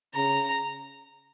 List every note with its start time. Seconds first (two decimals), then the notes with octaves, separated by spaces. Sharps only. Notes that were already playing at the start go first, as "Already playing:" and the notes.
0.15 C#3 A#5